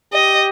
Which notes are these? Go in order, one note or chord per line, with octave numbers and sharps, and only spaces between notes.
G4 D#5